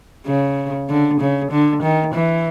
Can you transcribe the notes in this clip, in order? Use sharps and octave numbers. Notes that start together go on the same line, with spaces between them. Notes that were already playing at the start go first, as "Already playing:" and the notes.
C#3
D3
C#3
D3
D#3
E3